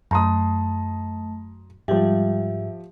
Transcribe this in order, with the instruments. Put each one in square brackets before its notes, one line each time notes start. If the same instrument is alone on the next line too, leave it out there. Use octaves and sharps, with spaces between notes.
[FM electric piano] F#2 [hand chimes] A3 A5 [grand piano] A#5 C6 D#6
[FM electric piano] G#2 G3 [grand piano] F3 G4 [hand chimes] E5